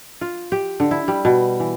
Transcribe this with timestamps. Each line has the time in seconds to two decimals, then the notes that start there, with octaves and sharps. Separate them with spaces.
0.21 F4
0.52 G4
0.80 D3
0.91 E4
1.08 G3
1.25 B2
1.60 E3